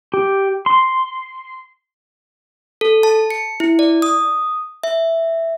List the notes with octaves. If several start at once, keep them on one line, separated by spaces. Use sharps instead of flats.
G4
C6
A4
A5
C#7
E4
D5
D#6
E5